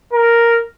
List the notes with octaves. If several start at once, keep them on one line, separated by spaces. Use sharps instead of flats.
A#4